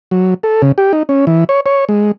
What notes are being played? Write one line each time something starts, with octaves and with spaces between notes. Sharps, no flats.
F#3
A4
C#3
G4
D#4
C#4
E3
C#5
C#5
G#3